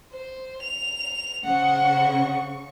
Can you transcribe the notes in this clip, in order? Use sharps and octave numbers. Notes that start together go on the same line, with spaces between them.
C5
F7
C#3 C5 F#5 C#6